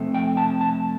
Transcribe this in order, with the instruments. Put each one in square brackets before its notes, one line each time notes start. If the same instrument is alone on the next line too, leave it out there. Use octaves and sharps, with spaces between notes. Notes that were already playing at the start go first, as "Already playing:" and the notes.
Already playing: [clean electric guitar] F2 C3 A3
G5
A5
A5